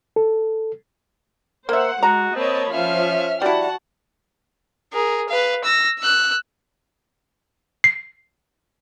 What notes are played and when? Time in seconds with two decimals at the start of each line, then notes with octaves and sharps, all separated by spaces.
0.16 A4
1.69 A#3 C5 E5 F#5
2.03 G#3 F#4 A#5
2.35 A#3 C4 C#5 D#5 A5 B5
2.73 F3 C#4 E5 F5 F6
3.42 G3 E4 F#4 F#5 A5
4.93 G#4 A#4
5.29 B4 F5
5.64 E6 A#6
5.99 E6 F#6
7.84 C7